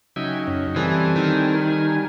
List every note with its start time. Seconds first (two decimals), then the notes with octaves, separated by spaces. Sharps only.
0.16 C#3 F#3 D#4 E5 G5 G#5
0.47 F#2 C#4
0.76 E3 G3 C4 A4 G#5
1.16 D#3